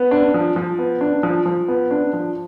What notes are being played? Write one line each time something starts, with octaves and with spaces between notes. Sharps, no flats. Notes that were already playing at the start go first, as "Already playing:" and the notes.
Already playing: B3
D4
F3
F3
B3
D4
F3
F3
B3
D4
F3